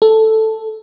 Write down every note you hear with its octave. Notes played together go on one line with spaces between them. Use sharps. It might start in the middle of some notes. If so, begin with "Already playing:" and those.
A4